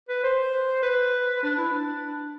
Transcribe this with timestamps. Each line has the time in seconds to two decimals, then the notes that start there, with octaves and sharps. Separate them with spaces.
0.09 B4
0.23 C5
0.83 B4
1.43 D4
1.58 E4
1.72 D4